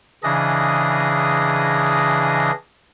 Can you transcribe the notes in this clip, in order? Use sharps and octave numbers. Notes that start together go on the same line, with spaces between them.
C#3 E3 D4 G#4 D#5 A#6